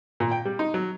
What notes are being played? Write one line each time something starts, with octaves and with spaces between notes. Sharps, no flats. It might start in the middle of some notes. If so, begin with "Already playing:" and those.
A#2
G5
G3
D#4
F#3